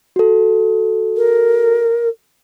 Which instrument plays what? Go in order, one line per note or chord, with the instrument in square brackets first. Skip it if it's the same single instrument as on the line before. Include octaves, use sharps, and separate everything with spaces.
[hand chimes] F#4 A4
[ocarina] A#4